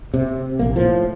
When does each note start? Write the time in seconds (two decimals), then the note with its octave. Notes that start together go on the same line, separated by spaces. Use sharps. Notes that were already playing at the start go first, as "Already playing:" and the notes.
0.14 C3
0.59 A#1 A#3
0.76 A2 F3